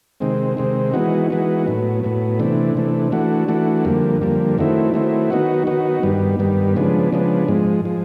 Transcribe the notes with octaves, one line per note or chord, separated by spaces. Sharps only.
C3 D#3 G#3 C4
C3 D#3 G#3 C4
E3 G#3 B3 D#4 F#4
E3 G#3 B3 D#4 F#4
A2 F#3 B3
A2 F#3 B3
C3 E3 A3 D4
C3 E3 A3 D4
E3 A3 D4 F#4
E3 A3 D4 F#4
F2 D3 G3 A#3
F2 D3 G3 A#3
D#3 F#3 A3 C4 E4
D#3 F#3 A3 C4 E4
D#3 F#3 B3 D#4 F#4
D#3 F#3 B3 D#4 F#4
G2 D#3 G3 B3
G2 D#3 G3 B3
C#3 F3 G#3 B3 D4
C#3 F3 G#3 B3 D4
G#2 F3 G#3
F3 G#3